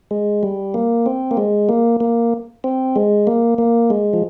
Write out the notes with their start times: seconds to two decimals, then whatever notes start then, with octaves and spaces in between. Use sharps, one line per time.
0.11 G#3
0.43 G3
0.74 A#3
1.06 C4
1.31 A#3
1.37 G#3
1.69 A#3
2.00 A#3
2.64 C4
2.96 G#3
3.27 A#3
3.58 A#3
3.90 G#3
4.13 F3